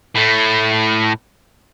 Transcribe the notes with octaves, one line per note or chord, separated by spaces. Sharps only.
A2 A3